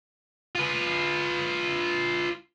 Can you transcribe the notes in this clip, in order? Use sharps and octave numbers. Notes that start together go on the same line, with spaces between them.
F4 B4